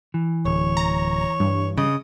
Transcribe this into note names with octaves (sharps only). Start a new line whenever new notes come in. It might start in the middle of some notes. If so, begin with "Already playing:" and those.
E3
D1 C#5
A#5
G2
C#3 D#5